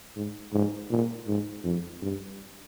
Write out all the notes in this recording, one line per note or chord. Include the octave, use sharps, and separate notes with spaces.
G#2
G#2
A#2
G#2
F2
G2